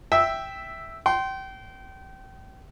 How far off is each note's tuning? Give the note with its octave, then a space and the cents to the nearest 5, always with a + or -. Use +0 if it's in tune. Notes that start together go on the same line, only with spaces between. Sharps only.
E5 +0 G5 +0 E6 -10
G5 -30 C6 +0